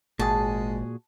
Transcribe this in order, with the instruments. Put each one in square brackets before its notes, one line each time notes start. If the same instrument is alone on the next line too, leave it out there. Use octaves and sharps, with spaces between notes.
[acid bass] G#1 [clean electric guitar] A#2 F#4 G#4 [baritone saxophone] G#3 [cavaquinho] A5